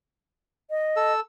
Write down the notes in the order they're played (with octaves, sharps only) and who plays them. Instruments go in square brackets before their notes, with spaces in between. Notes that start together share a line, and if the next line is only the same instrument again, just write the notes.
[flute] D#5
[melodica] A4 E6